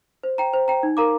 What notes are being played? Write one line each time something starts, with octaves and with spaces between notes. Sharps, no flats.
C5
G5 A#5
C5
G5 A#5
D#4
A#4 F5 A#5 D6